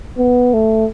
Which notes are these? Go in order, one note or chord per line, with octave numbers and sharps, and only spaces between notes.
B3
A3